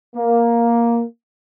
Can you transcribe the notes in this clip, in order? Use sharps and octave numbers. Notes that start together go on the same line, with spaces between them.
A#3